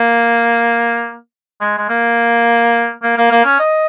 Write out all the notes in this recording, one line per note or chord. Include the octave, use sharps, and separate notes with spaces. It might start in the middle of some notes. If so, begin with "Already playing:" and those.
Already playing: A#3
G#3
G#3
A#3
A#3
A#3
A#3
C#4
D#5